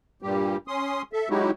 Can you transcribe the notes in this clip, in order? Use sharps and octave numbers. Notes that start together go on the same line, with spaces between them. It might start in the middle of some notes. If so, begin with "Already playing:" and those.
G2 A#2 G3 G4
C#4 C6 D#6
A4 E5
F#3 G#3 D#4 E4 F#4 G4